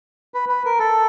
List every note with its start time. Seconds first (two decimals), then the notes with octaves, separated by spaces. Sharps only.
0.34 B4
0.49 B4
0.65 A#4
0.79 A4